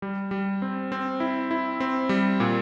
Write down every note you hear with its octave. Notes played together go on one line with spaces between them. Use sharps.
G3
G3
C4
C4
E4
E4
C4
G3
A#2